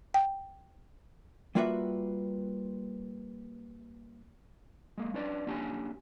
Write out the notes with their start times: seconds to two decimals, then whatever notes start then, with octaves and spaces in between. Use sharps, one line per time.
0.14 G5
1.55 G3 A#3 F4 F#4 B4 E5
4.98 G#3 A#3
5.14 C#4 D4 B4 D5
5.47 A#3 C#4 D4 G4 G#5